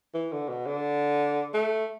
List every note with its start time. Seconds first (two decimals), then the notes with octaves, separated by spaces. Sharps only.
0.15 E3
0.32 D3
0.49 B2
0.67 D3
1.54 A3